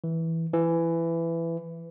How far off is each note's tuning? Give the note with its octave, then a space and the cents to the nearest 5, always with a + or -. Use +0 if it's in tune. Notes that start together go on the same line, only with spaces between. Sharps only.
E3 -10
E3 +15